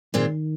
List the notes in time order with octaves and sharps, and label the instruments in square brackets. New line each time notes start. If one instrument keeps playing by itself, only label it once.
[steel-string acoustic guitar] A#2 G#3 C4 F4 [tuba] D#3